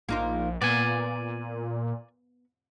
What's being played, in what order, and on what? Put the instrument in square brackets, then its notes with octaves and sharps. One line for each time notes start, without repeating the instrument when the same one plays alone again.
[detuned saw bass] A#1 [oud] A#3 D#4 F4
[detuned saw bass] A#2 [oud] B3 [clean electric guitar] D5 G#5